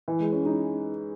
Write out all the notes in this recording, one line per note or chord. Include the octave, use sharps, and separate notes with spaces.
E3
G#3
C#4
D#4